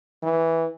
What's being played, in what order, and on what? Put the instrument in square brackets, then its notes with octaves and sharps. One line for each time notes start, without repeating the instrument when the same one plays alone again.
[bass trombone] E3